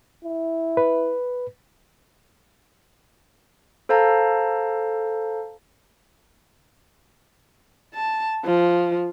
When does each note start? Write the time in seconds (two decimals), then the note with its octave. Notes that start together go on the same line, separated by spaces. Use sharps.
0.24 E4
0.77 B4
3.89 A4 C5 F5 A5 A#5
7.94 A5
8.45 F3